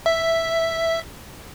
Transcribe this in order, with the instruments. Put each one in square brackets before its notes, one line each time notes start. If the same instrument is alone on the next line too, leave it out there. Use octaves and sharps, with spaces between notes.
[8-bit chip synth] E5